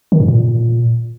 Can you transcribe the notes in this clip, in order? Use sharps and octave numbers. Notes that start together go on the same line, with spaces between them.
D#3
G2
A#2